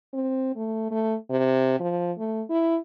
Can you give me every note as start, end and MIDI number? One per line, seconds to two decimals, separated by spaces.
0.14 0.52 60
0.56 0.87 57
0.91 1.15 57
1.30 1.79 48
1.80 2.12 53
2.18 2.42 57
2.50 2.77 64